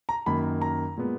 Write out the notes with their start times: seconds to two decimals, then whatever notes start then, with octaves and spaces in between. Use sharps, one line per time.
0.09 A#5
0.26 F#2 D#3 A#3 B5
0.62 A#5
0.97 A#2 G#3 B3